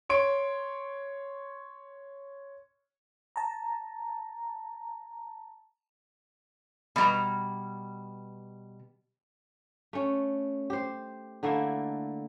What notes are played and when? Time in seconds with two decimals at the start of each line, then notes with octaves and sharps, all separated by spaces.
0.09 C#5 C6 D7
3.36 A5 A#5
6.96 B2 G3 A#5
9.93 A3 C#4
10.70 G4 C5
11.43 D3 A3 A#3 E4